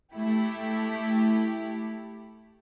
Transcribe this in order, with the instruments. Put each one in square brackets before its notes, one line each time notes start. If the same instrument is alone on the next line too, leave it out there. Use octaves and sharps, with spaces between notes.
[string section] A3 E4 G4